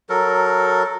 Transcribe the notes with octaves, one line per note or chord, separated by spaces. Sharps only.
F#3 A4 A#4